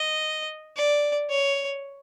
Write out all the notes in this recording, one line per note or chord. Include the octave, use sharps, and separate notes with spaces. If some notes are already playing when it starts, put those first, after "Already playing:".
Already playing: D#5
D5
C#5